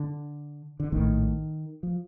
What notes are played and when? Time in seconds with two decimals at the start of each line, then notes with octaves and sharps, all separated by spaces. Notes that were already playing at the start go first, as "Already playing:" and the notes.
Already playing: D3
0.80 D3
0.92 A#1 A2 D#3
1.83 F3